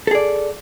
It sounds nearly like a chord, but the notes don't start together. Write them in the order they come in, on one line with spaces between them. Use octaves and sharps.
A4 G#4 D5